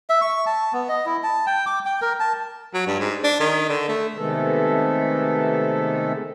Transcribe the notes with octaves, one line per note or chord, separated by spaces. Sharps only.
E5
C#6
A5
B3
D#5
E4
A5
G5
D6
G5
A#4
A5
F#3
G2
G#2
D4
D#3
D3
A3
C3 D#3 G#3 A3 B3 A4